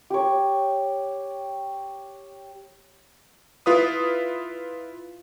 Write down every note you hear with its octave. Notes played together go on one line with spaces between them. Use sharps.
G4 C#5
E4 F4 B4 D#6